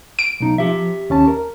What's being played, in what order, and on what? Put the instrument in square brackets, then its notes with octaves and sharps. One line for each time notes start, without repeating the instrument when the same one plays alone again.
[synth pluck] D7
[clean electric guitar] B1 D#4
[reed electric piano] F3 [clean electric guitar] G4 E5
[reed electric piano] D#2 C#4 A5
A#4